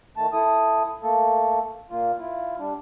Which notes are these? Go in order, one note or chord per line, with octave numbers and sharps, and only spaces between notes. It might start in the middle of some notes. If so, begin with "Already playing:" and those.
D#3 A3 A5
E4 A4 D#6
A3 A#3 A4
A#2 A#3 F4
E4 F4
G3 D4